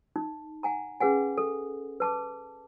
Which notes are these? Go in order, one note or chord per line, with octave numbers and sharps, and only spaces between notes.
D#4
F#5 G#5 A#5
C#4 G#4 B4 F#5 G#5
A4
B4 A5 D6